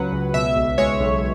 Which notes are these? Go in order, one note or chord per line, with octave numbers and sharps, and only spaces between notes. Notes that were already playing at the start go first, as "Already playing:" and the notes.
Already playing: C#2 C#3 F#3 B4 F#5
C#2
B2 E5
B1
G#3 C#5
B1